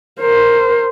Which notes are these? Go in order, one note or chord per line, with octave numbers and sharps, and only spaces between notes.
A#4 C5